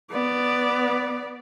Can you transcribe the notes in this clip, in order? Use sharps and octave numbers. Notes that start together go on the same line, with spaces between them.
B3 D5